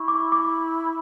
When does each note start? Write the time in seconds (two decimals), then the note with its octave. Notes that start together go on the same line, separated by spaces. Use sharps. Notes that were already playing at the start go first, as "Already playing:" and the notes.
Already playing: E4 C#6
0.08 D6
0.32 D6